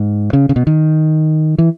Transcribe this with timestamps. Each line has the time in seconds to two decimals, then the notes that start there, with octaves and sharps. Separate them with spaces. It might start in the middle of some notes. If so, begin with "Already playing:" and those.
Already playing: G#2
0.33 C#3
0.49 C#3
0.56 B2
0.67 D#3
1.58 E3